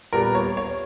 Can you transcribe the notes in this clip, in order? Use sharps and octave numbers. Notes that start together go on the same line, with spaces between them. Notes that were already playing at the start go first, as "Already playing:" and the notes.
A#2 G3 B3 A#4
C#5
C#5